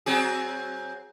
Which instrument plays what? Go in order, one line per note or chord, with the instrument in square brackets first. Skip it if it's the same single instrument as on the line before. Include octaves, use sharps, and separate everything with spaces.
[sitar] F#3 C4 G#4